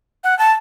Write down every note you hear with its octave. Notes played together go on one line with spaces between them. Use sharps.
F#5
A5